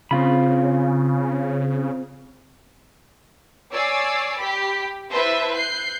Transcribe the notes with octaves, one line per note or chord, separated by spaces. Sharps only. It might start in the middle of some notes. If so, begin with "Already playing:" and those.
C#3 C4 F4 B5
C#5 D5 G#5 D6 E6 C7
G4 B5 B6
E4 B4 C5 E5 A5 C6
F#6 G6 C7